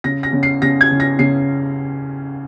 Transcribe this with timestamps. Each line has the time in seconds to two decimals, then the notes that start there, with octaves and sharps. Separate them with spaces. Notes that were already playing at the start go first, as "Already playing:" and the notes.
0.04 C#3 A#6
0.23 A#6
0.33 C#3
0.43 C7
0.62 C#3 A#6
0.81 G#6
0.91 C#3
1.00 A#6
1.19 C#3 C7